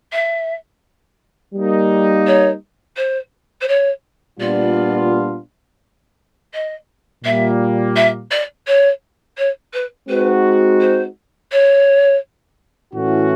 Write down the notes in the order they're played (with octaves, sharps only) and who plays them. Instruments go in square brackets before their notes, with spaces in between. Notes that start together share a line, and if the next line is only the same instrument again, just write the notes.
[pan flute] E5
[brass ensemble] G3 A#3 D#4
[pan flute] C#5
C5
C5
C#5
[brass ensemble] A#2 G3 B3 D4 F4 [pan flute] D5
[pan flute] D#5
[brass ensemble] A#2 G3 A#3 [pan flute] E5
[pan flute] E5
D5
C#5
C#5
B4
[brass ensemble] G#3 C4 D#4 F#4 [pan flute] B4
[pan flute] C5
C#5
[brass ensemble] A2 E3 A3 C#4 F#4